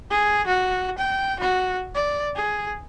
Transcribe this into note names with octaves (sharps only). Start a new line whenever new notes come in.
G#4
F#4
G5
F#4
D5
G#4